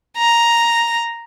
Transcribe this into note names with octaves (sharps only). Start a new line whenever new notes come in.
A#5